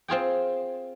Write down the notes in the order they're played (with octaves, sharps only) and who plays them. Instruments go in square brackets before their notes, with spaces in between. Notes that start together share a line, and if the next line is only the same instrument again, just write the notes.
[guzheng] C4 F4 G#4 G5